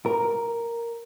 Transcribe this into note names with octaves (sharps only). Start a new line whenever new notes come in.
A#4